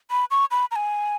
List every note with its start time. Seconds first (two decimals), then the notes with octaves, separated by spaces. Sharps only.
0.11 B5
0.31 C#6
0.51 B5
0.71 A#5
0.76 G#5